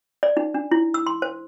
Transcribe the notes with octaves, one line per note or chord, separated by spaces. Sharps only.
D5
D#4
D4
E4
E6
C6
C5